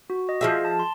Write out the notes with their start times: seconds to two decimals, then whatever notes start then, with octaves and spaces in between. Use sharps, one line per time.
0.10 F#4
0.29 D#5
0.41 F3 G#4 E5
0.65 A5
0.79 C6